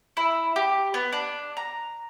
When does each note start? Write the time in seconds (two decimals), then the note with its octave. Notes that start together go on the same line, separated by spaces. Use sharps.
0.17 E4
0.56 G4
0.94 B3
1.12 D4
1.57 A#5